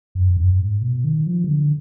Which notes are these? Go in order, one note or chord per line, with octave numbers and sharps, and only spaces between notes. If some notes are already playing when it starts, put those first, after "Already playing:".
F#2
F2
F#2
G#2
B2
D#3
F3
D#3
D3